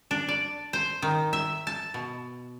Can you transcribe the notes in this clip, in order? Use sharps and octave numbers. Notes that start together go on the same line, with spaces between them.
D4
D5
C5
D#3
E5
A5
B2